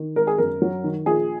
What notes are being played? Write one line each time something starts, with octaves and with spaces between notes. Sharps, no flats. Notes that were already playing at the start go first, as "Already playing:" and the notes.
Already playing: D#3
G#1 A#4
G#4
F#2 A#4
F#3
D#3
A#1 G#4